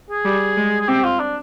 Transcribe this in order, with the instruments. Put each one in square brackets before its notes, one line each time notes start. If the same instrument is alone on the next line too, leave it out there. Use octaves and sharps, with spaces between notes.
[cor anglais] G#4
[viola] G3
G#3
[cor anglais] G#4
[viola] C4 [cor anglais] G4
[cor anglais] F4
D4